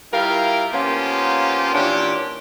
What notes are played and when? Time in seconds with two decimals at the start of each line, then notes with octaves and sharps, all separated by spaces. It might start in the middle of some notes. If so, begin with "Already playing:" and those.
0.13 G3 E4 F4 A#4 F5 G5
0.73 F3 A#3 B3 C#4 F4 G4
1.74 A#2 E3 C#4 D4 G4